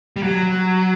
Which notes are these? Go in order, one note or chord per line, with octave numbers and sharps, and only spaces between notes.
G3
F#3